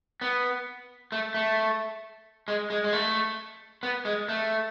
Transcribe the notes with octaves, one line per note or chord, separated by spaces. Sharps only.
B3
A3
A3
G#3
G#3
G#3
A3
B3
G#3
A3